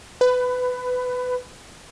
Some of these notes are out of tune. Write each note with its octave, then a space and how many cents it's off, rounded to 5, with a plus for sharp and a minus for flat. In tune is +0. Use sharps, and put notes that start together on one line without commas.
B4 +20